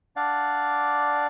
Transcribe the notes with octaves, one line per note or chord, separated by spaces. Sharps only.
D4 D5 F5 F#5